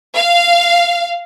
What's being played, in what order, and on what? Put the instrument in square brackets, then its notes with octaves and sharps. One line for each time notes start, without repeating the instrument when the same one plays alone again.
[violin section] F5